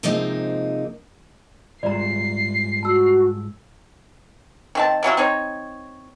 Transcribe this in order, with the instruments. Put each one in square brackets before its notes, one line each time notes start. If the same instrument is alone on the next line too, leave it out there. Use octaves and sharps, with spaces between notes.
[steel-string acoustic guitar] C3 F3 G#3 A#3 C4 D#4
[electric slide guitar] G#2 G3 F4 [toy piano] D5 A#5 [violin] C7
[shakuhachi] F#4 [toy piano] A5 E6
[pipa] D#3 C4 A5
C3 F#3 E4 F4
C4 D#4 C#5